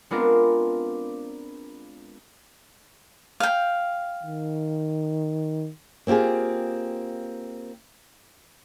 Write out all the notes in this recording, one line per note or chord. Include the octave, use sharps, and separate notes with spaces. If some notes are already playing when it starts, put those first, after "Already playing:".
G#3 B3 C4 D4 F4 A#4
F5 G5
D#3
A#3 C4 F4 G4 G#4